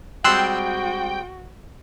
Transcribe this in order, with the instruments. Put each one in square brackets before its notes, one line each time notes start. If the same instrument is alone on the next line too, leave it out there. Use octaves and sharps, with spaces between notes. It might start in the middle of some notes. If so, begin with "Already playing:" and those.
[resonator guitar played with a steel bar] G3 G#3 C4 [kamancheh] F#4 [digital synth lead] G5 [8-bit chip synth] C6 E6 F#6